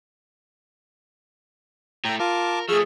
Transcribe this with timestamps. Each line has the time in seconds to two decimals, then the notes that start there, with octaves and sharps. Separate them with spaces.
2.05 A2 A3 G5 A#5
2.20 F4 A#4 A5 D6
2.69 F3 A3 G#4 C#6 E6 F6